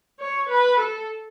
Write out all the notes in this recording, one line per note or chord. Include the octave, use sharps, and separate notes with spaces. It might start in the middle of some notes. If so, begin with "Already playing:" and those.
C#5
B4
A4